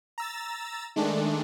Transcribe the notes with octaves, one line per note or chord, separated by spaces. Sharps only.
A#5 E6 A6
D#3 G#3 A3 D4